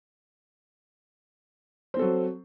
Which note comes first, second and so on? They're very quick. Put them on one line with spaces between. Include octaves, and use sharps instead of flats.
C5 C4 A4 F#3